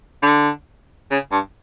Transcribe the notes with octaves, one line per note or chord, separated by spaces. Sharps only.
D3
C#3
G2